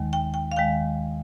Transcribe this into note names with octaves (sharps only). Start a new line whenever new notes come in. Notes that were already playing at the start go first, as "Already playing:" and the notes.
Already playing: D#2 D#3 G#3
G5
G5
F5
D#2 D#3 G#3 G5